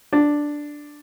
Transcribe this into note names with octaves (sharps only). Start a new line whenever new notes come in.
D4